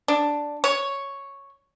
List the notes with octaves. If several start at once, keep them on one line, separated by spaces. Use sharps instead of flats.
D4
C#5